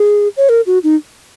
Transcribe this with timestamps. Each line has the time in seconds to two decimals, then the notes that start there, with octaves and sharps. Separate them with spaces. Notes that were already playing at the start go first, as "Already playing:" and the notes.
Already playing: G#4
0.37 C#5
0.49 A#4
0.67 F#4
0.84 D#4